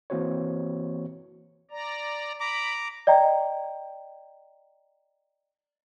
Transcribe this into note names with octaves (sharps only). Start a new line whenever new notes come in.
E3 A#3 C4 F#4 C5 C#5
D5 A#5
A#5 B5 D6
D5 D#5 G5 A#5